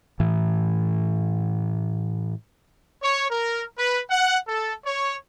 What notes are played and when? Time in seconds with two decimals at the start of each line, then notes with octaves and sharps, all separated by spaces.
0.20 A2 E3
3.02 C#5
3.30 A#4
3.78 B4
4.10 F#5
4.48 A4
4.86 C#5